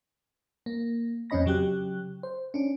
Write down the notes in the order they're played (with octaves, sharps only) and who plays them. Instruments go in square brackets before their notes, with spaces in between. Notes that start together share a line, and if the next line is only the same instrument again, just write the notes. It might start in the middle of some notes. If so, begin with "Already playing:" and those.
[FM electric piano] A#3
F2 C4 C#4 D#5 B5 A#6
C#3 F#3 G4 F#6
C5
C#4 D4